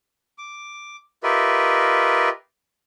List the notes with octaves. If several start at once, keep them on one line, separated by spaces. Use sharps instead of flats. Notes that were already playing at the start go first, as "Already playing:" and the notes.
D6
F4 G4 A#4 B4 D#5 E5